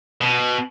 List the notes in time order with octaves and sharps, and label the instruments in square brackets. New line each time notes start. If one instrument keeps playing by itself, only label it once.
[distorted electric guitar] B2